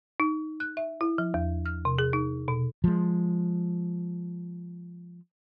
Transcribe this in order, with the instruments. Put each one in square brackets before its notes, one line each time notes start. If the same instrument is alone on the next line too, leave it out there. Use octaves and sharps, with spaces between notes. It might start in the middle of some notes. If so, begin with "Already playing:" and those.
[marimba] D#4
F#6
E5
E4
F3
E2
F6
C3
G#4
D#4
B2
[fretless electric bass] F3 G#3